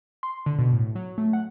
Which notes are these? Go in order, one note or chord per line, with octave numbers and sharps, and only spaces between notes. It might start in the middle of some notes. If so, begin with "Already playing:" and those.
C6
D3
B2
A2
F#3
A3
F#5